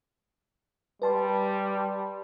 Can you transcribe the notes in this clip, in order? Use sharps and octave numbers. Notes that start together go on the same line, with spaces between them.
G3 B4 A5 C6